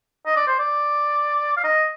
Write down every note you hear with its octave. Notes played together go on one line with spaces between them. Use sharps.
D#5
D5
C5
D5
F5
D#5